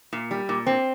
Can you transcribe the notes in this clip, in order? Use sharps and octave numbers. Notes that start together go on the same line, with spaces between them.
A#2
G3
A#2
C4